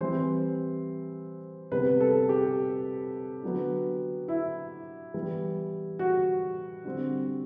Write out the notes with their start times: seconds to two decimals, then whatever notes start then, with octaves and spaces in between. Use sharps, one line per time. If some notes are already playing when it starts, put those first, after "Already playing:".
0.01 E3 G3 C4 C5
1.72 C3 G3 B3 B4
2.00 A4
2.29 G4
3.43 D3 F#3 B3
4.28 E4
5.14 E3 G3 B3
5.99 F#4
6.85 D3 G3 C4